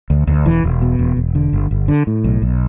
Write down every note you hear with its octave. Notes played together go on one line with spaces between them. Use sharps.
D2
D2
E1 E3
E1
B2
E1
E1
D3
G1
G1
D3
A2
B1
B1